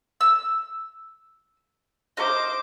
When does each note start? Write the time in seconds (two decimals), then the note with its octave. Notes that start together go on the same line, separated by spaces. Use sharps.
0.21 E6
2.17 C5 D#5 D6 F6